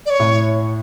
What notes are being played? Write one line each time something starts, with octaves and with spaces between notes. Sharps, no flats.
D5
C#5
A2